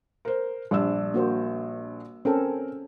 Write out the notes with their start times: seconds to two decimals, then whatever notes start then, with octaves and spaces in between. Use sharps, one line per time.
0.25 A#4 C5
0.71 A#1 G3 D4 E6
1.14 A#3 F#4 C5
2.25 C4 C#4 A4 A#4